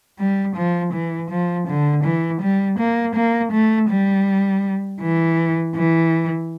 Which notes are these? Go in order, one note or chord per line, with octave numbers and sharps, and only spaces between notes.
G3
F3
E3
F3
D3
E3
G3
A#3
A#3
A3
G3
E3
E3